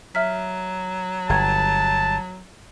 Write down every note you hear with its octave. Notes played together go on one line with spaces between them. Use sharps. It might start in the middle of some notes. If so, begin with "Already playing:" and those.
F#3 E5 F6 B6
G1 G5 A5 A#5 G#6